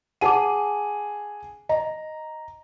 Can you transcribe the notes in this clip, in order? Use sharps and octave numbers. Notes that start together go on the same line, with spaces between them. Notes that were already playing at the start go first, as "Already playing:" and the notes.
G#4 F#5 A5 D6 D#7
D#5 A#5